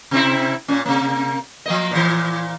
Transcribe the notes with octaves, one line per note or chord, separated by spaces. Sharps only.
C3 C4 E4
A#2 C#4
C3 A#3
F3 A#3 D#5
A#2 E3